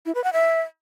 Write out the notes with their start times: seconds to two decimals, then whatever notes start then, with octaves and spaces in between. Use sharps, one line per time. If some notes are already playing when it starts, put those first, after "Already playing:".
0.06 E4
0.15 B4
0.24 F#5
0.33 E5